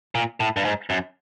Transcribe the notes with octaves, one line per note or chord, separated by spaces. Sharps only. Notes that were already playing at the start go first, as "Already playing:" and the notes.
A#2
A2
G2
G#2
F#2